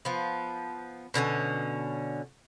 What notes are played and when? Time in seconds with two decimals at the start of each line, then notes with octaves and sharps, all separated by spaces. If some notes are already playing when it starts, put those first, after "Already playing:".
0.05 F3 B3
1.14 B2 D3 C4 C#4